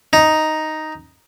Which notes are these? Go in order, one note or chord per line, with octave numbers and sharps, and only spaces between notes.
D#4